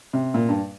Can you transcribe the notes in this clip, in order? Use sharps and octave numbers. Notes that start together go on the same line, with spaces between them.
C3
A#2
G2